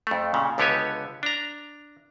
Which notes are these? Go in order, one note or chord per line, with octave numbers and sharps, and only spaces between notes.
F2 A3
A#2 C#3
C#2 D3 B3 G4 C#5 G#5
D4 A#5